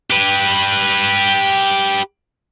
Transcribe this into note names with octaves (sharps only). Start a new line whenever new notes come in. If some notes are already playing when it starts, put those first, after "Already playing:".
G4 B4